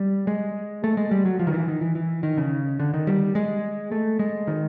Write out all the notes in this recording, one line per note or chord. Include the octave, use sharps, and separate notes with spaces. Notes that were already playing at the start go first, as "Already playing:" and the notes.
Already playing: G3
G#3
A3
G#3
G3
F#3
F3
D#3
E3
D#3
E3
E3
D#3
C#3
D3
D#3
G3
G#3
A3
G#3
D#3